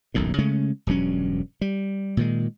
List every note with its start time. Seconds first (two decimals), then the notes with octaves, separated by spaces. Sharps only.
0.14 D#1 B1 F#2 A2
0.38 C#3 G#3 A3 C#4
0.87 E1 G2 F#3 C#4
1.61 G3
2.17 A#2 D#3 G#3